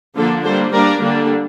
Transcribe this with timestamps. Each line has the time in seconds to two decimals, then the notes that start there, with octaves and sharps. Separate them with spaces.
0.16 D3 F3 A#3 D4 F4 A4
0.44 G3 A#3 D4 A4 C5
0.72 G3 A#3 D4 A#4 D5
1.01 D3 G3 A#3 D4